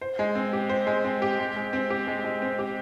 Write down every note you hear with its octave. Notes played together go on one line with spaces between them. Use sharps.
C5
G#3
C4
G4
C5
G#3
C4
G4
G#3
G#3
C4
G4
G#3
G#3
C4
G4